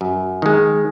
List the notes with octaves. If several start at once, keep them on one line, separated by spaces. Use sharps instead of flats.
F#2
D#3 G#3